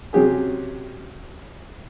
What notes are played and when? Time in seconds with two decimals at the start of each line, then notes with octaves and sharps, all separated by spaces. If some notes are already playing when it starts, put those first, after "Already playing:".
0.13 C3 F#3 C#4 G4 G#4